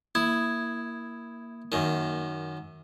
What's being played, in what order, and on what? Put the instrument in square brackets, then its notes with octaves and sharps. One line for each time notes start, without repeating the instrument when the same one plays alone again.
[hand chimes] A#3 D#6 G#6 [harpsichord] E4
[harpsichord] F#2 D#3